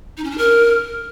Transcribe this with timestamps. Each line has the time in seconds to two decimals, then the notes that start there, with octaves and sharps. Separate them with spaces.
0.17 D#4
0.24 C#4
0.31 D4
0.38 A#4